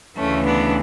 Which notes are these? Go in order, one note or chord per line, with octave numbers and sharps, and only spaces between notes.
D2 C#3 E3 A3 C#4
B3 D4